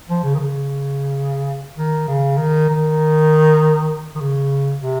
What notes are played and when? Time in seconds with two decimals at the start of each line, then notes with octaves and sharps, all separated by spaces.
0.09 F3
0.24 C#3
0.35 D#3
0.39 C#3
1.77 D#3
2.08 C#3
2.38 D#3
2.69 D#3
4.15 D#3
4.21 C#3
4.83 C3